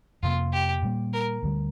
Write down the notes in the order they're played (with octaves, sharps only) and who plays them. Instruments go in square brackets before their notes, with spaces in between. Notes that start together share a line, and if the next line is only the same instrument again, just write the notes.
[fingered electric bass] F2 C3 A#3 [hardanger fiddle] F4
[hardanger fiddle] G4
[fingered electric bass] A#2 G3 A#3
[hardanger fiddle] A#4
[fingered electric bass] D2 D3 G3